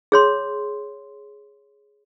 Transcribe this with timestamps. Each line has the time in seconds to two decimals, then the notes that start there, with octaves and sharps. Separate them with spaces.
0.12 G#4 C#5 C6